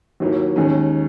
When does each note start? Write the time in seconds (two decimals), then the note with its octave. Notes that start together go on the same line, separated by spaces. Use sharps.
0.20 D#2 D#3 F#3 A#3 E4
0.56 D#2 D#3 G#3 C#4